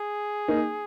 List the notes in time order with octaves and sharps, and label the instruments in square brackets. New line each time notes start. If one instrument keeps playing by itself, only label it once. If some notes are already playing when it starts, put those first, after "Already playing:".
Already playing: [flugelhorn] G#4
[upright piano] A#3 D#4